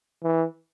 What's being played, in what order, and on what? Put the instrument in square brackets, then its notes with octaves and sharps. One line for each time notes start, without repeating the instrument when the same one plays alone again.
[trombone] E3